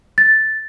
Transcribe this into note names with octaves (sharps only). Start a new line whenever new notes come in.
A6